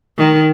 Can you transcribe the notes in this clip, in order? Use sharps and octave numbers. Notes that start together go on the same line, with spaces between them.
D#3